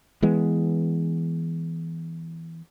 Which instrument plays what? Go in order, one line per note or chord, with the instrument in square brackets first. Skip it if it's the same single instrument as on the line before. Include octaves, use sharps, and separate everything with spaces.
[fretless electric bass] E3 G#3 B3